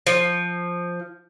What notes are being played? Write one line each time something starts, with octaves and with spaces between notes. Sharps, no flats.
F3